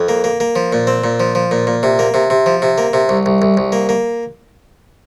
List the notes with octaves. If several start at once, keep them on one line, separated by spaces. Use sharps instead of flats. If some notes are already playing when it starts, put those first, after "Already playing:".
Already playing: F2
A#3
A#3
A#3
F3
A#2
C4
A#2
F3
F3
A#2
A#2
C3
A#3
C3
C3
F3
C3
A#3
C3
C2
C2
C2
C2
A#3
A#3